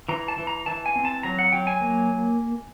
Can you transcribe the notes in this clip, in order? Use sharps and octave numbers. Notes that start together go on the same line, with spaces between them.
E3 A#5
A5
E3
A#5
E3 A5
G#5
C4
A5
F#3 A#5
F#5
F#3 G5
G#5
A#3